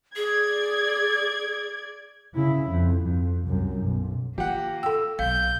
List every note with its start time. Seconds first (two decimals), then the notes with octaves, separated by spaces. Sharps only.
0.16 G#4 D5 G#6
2.35 C#3 E4
2.70 F2
3.01 F2
3.45 C2 F#2
3.83 B1
4.38 D#3 A#3 F4 G4 F#5
4.83 A4 G5 E6
5.19 B1 F5 G6